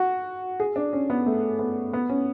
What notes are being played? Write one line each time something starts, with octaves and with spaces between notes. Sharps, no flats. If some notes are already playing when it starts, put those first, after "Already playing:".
Already playing: F#4
G#4
D4
C#4
B3
A3
B3
B3
C#4